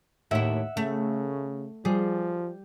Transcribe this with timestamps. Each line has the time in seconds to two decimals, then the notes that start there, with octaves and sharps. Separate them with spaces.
0.31 D#2 A2 E4 E5 F#5
0.77 C#3 A3
1.85 F3 G3 G#4